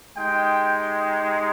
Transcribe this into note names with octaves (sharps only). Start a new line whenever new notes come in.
G#3 D#4 G4 G5